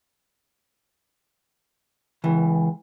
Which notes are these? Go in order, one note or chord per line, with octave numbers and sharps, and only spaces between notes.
C#2 E3